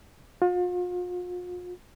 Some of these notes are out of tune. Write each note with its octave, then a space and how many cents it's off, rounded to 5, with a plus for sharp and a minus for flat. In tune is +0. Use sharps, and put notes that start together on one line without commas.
F4 +40